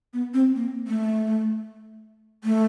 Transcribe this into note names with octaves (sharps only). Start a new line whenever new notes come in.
B3
C4
A#3
A3
A3